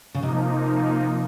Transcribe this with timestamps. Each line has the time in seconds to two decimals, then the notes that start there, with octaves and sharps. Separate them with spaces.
0.15 C#3
0.23 C3 F3 A#3 D#4